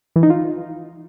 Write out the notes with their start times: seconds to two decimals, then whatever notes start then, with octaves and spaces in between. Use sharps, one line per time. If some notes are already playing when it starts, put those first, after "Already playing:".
0.16 E3
0.23 D#4
0.30 F4